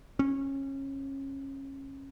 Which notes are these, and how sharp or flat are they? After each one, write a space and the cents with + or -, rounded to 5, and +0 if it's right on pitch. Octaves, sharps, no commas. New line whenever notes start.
C#4 -25